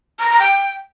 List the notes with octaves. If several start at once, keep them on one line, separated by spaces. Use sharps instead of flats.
A#5
A#5
G5